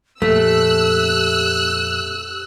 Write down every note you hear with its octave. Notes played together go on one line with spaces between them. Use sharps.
F2 A#2 A3 G4 E6 F#6